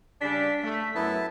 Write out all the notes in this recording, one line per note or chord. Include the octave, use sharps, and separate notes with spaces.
C#3 G3 D4 G#5 B6
A3
F#2 B3 E4 A5